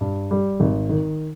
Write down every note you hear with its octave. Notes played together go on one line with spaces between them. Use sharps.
G2
G3
G#1
D#3